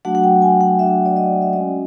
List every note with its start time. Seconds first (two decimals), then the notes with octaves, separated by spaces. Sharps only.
0.05 F#3 A3 D4 F#4 F#5
0.15 F#5
0.24 G5
0.42 G#5
0.61 F#5
0.79 F#3 A3 D4 F#4 E5
1.05 D5
1.16 D#5
1.42 E5
1.53 G#3 C#4 F#4 D#5